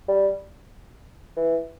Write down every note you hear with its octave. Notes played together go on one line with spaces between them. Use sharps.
G3
E3